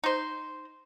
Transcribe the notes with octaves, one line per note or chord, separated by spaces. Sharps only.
D#4 C5